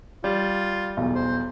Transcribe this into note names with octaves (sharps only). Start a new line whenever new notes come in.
G3 F4
B1 E2
C5